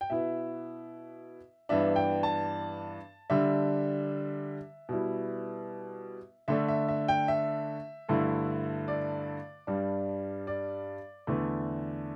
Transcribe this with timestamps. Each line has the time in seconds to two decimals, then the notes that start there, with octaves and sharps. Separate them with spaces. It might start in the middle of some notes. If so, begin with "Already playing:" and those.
0.01 G5
0.10 B2 B3 E4 E5
1.69 G2 E3 B3 D4 E5
1.96 G5
2.23 A5
3.30 D3 G3 D4 E5
4.89 B2 G3 E4
6.48 D3 A3 D4 E5
6.68 E5
6.89 E5
7.08 G5
7.28 E5
8.09 G2 D3 A3 E4
8.88 D5
9.67 G2 G3 D4
10.47 D5
11.27 E2 D3 A3